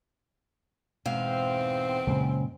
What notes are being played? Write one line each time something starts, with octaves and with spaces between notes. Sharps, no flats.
E2 G#2 B2 C4 F5
F#2 A#2 C#3 G#3